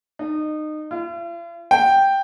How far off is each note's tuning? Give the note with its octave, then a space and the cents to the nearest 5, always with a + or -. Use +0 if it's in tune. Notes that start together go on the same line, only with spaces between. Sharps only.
D#4 -25
F4 -45
G5 +0